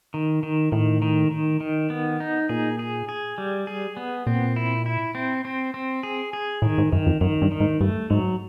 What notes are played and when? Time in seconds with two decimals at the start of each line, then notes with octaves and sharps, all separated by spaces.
0.14 D#3
0.43 D#3
0.72 A2 D#3
1.02 D#3
1.31 D#3
1.61 D#3
1.90 B3
2.20 D#4
2.49 A#2 G#4
2.79 G#4
3.09 G#4
3.38 G3
3.67 G#4
3.97 B3
4.27 A#2 C4
4.56 E4
4.86 E4
5.15 C4
5.45 C4
5.74 C4
6.03 G#4
6.33 G#4
6.62 A2 D#3
6.78 G#2
6.92 F#2 D#3
7.06 F2
7.21 F#2 D#3
7.42 G2
7.52 D#3
7.60 G#2
7.81 G2 A3
8.10 G#2 F#3